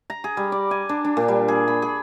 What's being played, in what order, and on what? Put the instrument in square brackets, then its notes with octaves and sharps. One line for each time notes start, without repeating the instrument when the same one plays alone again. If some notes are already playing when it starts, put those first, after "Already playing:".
[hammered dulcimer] A#5
G#4
G3
D5
G#5
D4
D4
A#2
G3
G#4
B5
G#4